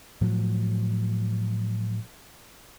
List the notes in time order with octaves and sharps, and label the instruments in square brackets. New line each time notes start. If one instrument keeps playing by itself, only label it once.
[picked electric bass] A2 F3 F#3